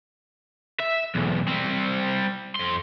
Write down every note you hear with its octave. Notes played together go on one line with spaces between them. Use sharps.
E5
B1 E2
G3 C4
F2 C6